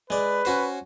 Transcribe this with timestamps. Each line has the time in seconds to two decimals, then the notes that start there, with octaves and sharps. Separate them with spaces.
0.10 G#3 B4 D5
0.45 C#4 F#4 C5